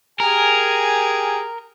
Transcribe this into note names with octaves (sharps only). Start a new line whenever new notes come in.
G4 G#4 A#4 G#5